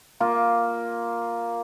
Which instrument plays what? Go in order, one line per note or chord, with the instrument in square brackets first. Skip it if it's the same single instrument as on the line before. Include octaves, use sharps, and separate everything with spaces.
[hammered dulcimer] A#3 F4